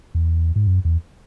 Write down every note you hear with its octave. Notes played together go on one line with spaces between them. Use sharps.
E2
G#2
F#2
E2